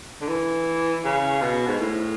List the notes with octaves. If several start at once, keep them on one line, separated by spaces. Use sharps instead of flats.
D3
E3
C#3
B2
G#2
A2